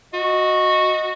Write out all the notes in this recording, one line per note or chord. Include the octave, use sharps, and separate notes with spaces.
F#4 D#5